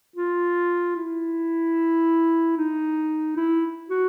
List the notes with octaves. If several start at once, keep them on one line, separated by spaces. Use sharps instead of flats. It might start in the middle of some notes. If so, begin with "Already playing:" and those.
F4
E4
D#4
E4
F#4